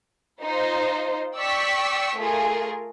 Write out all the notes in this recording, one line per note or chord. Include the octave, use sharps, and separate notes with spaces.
D#4 F4 C5
D5 G5 C#6 E6 B6
A3 F4 G#4 A#4